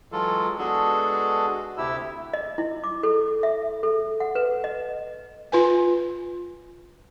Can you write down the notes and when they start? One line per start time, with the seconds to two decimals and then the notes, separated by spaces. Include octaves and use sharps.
0.12 E3 F#3 G#3 F4 A4
0.59 G#3 B3 D4 F#4 G#4 A4
1.78 D2 C3 A3 E4 G4 E6
2.33 D#5
2.58 E4
2.84 D6
3.03 A4
3.43 E5
3.83 A4
4.20 F#5
4.35 B4
4.64 D#5
5.52 F4 B4 G#5